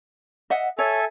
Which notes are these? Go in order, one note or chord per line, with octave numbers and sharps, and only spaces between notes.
D#5 E5 F#5
A4 C#5 E5 G#5